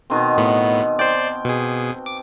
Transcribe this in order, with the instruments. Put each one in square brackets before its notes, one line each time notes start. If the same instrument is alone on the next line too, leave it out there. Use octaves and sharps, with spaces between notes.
[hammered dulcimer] B2 D#3 C4
[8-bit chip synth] A2 B3
[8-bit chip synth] C5 D5 [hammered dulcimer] G5 D6
[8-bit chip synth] B2 G#4
D6